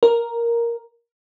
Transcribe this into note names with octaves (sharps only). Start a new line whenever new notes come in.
A#4